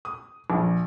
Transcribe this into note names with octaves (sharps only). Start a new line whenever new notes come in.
D#6
A#1